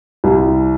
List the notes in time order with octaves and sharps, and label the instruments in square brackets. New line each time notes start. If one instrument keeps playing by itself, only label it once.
[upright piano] C2